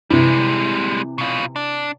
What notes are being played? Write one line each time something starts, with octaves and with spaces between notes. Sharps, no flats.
C3 E3 G3 G#3
B2 F4
D4